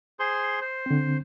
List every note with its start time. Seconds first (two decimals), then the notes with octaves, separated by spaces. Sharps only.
0.19 G#4 C5 C6
0.62 C5
0.86 D3 C4